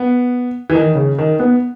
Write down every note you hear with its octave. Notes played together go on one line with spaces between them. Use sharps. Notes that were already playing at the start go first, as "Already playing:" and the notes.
Already playing: B3
E3
D#3
C#3
D#3
B3